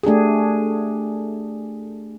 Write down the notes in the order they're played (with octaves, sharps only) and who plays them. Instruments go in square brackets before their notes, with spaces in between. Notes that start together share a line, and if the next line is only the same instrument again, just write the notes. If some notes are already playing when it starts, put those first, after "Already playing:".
[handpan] A3 D4 G4 G#4